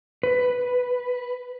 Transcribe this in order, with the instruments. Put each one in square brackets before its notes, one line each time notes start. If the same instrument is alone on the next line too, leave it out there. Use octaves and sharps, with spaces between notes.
[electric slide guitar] B4